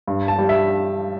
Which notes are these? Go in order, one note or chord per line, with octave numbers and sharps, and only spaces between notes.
G2
A5
G3
E5